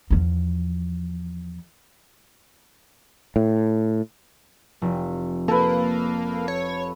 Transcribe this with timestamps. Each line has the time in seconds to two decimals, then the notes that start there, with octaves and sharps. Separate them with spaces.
0.10 E2 F3
3.36 A2
4.82 F1
5.48 A#3 A4 B4
6.48 C#5